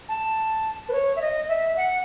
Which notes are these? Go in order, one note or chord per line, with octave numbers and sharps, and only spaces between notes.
A5
B4
C#5
E5
D#5
E5
F#5